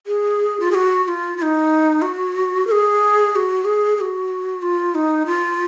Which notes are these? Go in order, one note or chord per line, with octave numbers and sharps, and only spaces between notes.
G#4
F4
G#4
F#4
F#4
F4
F4
D#4
F#4
A#4
G#4
G#4
F#4
G#4
G#4
F#4
F4
D#4
F4